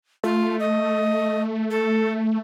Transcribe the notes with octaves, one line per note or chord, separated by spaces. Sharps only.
A3 F4
D#5
A4